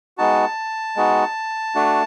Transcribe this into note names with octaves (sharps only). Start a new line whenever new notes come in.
G#3 B3 D#4 F#4 A5
G#3 B3 D#4 F#4
A3 D4 F#4